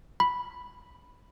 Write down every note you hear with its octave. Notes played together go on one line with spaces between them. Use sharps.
B5